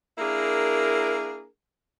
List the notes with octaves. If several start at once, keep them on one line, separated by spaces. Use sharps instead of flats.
A#3 D4 E4 G#4 A#4